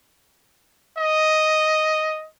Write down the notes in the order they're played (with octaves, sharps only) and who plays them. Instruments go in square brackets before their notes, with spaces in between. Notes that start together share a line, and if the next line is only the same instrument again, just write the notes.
[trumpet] D#5